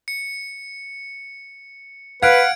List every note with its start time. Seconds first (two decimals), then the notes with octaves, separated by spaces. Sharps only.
0.08 C#7
2.23 B4 F5 F#5 G#6 D7